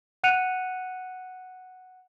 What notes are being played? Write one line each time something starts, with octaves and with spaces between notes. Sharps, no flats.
F#5 F#6 C#7 D#7 F7